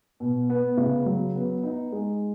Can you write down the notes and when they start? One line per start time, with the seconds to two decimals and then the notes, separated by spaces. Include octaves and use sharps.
0.20 B2
0.50 B3
0.77 C#3
1.06 F#3
1.35 B3
1.63 D#4
1.92 G#3